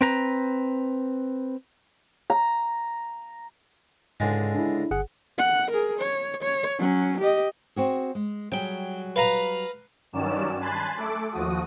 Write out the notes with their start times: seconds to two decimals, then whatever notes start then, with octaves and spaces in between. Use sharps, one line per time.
0.01 C4 B4 A#5
2.30 A#5
4.20 C#2 G#2 D3 G#3
4.55 D4 E4
4.91 G1 G#4 F#5
5.38 F#5
5.71 G#4 A#4
5.99 C#5
6.42 C#5
6.78 F#3 C#4
7.20 G4 D#5
7.76 C4 F#4 G#4
8.15 G#3
8.52 F#3 G3 G#4 G5
9.16 B4 F5 A#5
10.13 G2 D#3 F#3 C#4 D5 E7
10.60 G#5 A5 B5 C6 F#6 A6
10.97 A3 A4 D6
11.31 D#2 F3 F#4 D#6